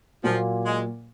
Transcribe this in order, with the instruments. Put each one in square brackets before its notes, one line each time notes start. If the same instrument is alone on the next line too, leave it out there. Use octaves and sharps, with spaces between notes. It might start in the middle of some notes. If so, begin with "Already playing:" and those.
[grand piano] A#2 F#3 A#3 F4 [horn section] F3
[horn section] G#3